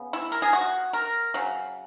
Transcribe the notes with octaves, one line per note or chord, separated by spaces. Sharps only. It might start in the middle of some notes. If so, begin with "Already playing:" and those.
Already playing: C#3 B3
E4
A#4
G#4
F#4
A#4
C#3 F#3